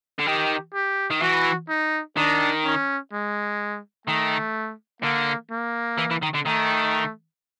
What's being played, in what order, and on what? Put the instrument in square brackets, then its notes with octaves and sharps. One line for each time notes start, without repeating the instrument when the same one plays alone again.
[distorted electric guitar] D3
[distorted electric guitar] D#3 [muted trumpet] G4
[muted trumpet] G4
[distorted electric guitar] D#3
[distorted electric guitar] E3 [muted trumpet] F#4
[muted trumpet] D#4
[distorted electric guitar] D#3 [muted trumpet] D4
[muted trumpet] C#4
G#3
[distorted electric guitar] D#3 [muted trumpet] A3
[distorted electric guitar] D3 [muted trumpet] A#3
[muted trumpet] A#3
[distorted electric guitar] E3
E3
D#3
D3
[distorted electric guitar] D#3 [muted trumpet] A3